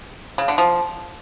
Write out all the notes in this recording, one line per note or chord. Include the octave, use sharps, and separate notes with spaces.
C#3
D3
F3